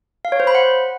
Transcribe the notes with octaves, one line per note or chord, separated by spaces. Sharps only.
F5
C#5
C5
B5
F#5